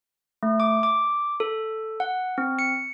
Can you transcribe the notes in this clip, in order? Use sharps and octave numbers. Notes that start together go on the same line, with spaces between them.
A3
D6
D6
A4
F#5
C4
C#7